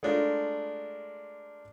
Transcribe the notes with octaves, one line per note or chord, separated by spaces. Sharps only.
G#3 A3 D4 F4 A#4